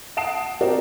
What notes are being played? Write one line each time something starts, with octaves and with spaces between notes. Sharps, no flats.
F#5 A5 D#6 C7 D7 E7
C4 F#4 G4 A#4 D5